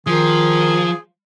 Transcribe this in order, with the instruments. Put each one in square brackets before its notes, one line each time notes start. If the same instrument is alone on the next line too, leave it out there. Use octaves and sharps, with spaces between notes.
[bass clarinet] D#3 [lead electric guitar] F3 [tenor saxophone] G#4